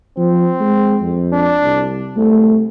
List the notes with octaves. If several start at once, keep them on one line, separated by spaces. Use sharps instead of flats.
F3 C4
G#3
F2
D4
C2
C2 A3